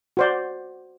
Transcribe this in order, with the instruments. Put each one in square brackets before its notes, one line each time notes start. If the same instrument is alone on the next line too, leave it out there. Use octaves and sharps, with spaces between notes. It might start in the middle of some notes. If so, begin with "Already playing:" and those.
[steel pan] F#4 C5 D5